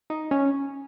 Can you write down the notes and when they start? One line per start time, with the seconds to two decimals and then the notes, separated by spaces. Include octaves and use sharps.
0.10 D#4
0.31 C#4